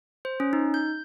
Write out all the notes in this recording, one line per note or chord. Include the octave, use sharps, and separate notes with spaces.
C5
C#4
D#4
G6